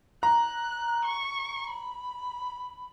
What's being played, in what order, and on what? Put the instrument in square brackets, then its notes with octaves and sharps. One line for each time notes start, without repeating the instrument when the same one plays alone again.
[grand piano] A#5 [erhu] F#6
[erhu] C#6
B5